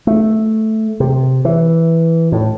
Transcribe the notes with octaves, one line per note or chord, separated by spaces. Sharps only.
A3
C3
E3
A2